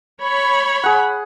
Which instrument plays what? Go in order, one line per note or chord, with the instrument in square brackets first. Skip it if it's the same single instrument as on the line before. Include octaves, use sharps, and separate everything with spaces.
[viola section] C#5 B5
[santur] G#4 F#5